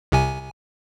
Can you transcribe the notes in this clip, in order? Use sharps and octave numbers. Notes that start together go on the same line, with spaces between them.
C2 C3 G#5